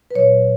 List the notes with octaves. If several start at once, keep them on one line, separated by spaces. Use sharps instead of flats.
B4
A#2 F#3 C#5